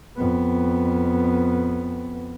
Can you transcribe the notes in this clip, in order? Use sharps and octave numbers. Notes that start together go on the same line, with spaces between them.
F2 B3